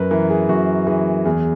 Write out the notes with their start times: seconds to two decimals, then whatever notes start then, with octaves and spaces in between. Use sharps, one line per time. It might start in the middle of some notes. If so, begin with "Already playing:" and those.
Already playing: F#2 A#4 B4
0.11 E3 A#4
0.30 G#4
0.49 F#2 F#4
0.87 E3 G#4
1.25 E2 G#4